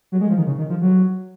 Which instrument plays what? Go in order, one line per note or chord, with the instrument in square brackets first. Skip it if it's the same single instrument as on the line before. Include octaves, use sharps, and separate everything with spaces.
[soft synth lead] F#3
G#3
F3
D#3
C#3
D#3
F3
F#3